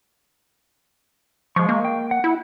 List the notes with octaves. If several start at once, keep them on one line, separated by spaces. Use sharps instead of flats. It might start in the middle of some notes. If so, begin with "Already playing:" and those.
F3 G#3 C#6
A#3
G5
F#5
E4